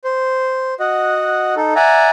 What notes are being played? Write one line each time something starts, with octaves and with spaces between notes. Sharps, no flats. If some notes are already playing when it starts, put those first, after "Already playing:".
C5
F#4 D#5 F#5
D#4 A4
D5 E5 F#5 G#5 A#5